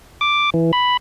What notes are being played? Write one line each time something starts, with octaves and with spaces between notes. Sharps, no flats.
D6
E3
B5